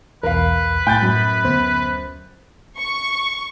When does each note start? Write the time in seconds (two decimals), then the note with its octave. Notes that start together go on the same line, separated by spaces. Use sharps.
0.23 B1 E2 A#4 B4 F5
0.87 A2 G5 G6 A6
1.02 F#2 F#3
1.44 D2 B3 C5
2.77 C#6